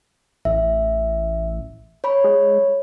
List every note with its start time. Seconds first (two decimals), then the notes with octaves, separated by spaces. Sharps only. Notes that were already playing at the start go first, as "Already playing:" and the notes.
0.45 A1 E5
2.04 C#5 B5
2.24 G#3